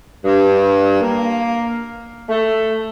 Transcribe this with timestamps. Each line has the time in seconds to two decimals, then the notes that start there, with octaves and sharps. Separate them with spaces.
0.25 G2
1.00 A#3
2.29 A3